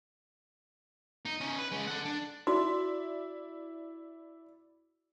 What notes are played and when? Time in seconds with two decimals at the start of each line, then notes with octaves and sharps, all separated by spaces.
1.25 D#4
1.41 C#4 D#4
1.59 B4
1.72 G#3 C#4
1.88 A4 F#5
2.05 D4
2.47 E4 F#4 D5